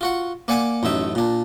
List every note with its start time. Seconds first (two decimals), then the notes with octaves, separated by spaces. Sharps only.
0.01 F4 F#4 F#5
0.48 A#3 D5 F#5 G#5 D6
0.83 A1 F#2 D#4 E5
1.15 A#2 D4